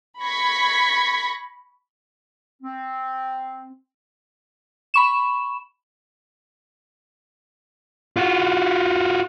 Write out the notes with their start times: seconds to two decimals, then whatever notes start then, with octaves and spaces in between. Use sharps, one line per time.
0.23 B5 C#6 G#6 A#6 B6
2.62 C4
4.94 B5 C#6 E7
8.17 F4 F#4